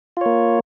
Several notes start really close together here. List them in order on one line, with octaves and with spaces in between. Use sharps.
F4 C#5 A#3